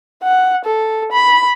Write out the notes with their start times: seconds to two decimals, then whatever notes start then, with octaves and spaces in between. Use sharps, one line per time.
0.23 F#5
0.65 A4
1.12 B5